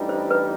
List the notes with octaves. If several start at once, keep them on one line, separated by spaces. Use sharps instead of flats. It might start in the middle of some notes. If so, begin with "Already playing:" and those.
Already playing: A1 G2 E3 G3 D#4
C5
B4